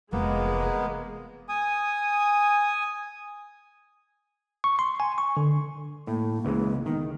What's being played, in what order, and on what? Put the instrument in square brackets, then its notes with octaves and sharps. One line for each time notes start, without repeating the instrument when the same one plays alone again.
[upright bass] F1 E3 [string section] G#3 [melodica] A#3 B3
[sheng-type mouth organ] G#5 D#6
[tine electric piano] C#6
C6
G#5
C#6
D3
[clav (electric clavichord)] A2 [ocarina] A#3
[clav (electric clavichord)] C#2 E3 G#3
[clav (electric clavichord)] D#3 [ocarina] B3